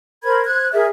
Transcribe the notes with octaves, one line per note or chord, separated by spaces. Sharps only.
A#4 C5 B5 G#6
C5 F#6 G#6
G#4 A#4 D5 E5